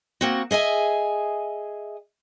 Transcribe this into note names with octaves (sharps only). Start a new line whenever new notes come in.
A#3 C4 F#4
G#4 D#5 E5 G#5